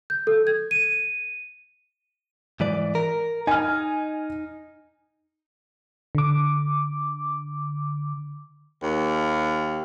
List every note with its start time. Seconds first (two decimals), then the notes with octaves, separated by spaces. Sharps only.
0.10 G6
0.27 A4
0.47 G#6
0.71 D#7
2.60 G#2 E3 D5
2.95 A#4
3.47 D#4 G#5 F6
6.15 D3 D6
8.83 D#2